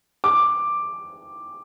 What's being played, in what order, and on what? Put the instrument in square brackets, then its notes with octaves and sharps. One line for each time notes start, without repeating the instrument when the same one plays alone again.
[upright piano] D6